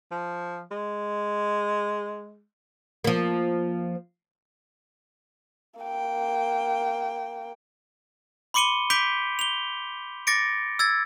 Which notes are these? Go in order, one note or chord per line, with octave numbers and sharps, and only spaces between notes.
F3
G#3
F3 A#3
A#3 G5
B5 C6 D6 C#7 D#7 G7
D6 G6 B6 D7 F7 G7
F7 G7
D6 A6 A#6 C#7 D7
E6 G#6 A6